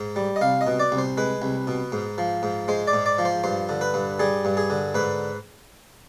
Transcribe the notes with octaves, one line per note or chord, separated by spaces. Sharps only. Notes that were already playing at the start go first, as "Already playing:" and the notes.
Already playing: G#2
G3
D#5
C2 F5
D#5
B2
D5
C2
C5
G#3 B4
C2
B2
G#2
F3
G#2
G#3 C5
D5
G#2
D5
F3
C5
G2 C5
D3
B4
G2
G3 G#4
G2
G#4
D3
G#2 B4